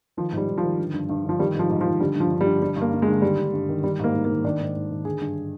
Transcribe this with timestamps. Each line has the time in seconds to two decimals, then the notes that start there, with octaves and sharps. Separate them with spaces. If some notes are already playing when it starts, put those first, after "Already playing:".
0.17 D#3 F3
0.32 G#2
0.37 G3
0.48 G#2
0.58 F3
0.63 D#3
0.79 D3
0.94 G2
1.09 G2
1.25 D3 F3
1.40 D#3 G3
1.55 G#2 F3
1.70 G#2
1.81 F3
1.85 D#3
2.00 D3 G3
2.15 G2 F3
2.31 G2
2.41 G3
2.46 D3
2.61 D3 G3
2.76 G2
2.81 A#3
2.93 G2
3.02 G#3
3.08 D3
3.22 D#3 G3
3.38 G2
3.54 G2
3.69 D#3
3.83 D#3 G3
3.99 G#2 A#3
4.14 G#2
4.25 A#3
4.30 D#3
4.44 D#3 D4
4.60 G#2
4.76 G#2
4.91 D#3
5.05 D3 G#4
5.21 G2